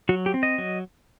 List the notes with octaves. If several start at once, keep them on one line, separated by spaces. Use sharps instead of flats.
F#3 F#4
G4
C4
D#5
F#3